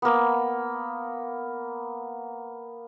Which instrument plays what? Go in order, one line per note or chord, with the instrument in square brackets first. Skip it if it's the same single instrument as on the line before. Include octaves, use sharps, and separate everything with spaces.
[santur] A#3 B3